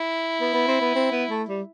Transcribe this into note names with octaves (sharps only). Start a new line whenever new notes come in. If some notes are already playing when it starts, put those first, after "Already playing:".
Already playing: E4
B3
B3
C4
B3
C4
B3
A3
G3